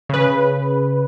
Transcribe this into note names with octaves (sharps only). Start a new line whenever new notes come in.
C#3 B4